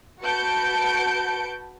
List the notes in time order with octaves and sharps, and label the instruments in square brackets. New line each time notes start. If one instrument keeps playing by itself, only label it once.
[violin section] F#4 B4 A5 G6 C#7 D7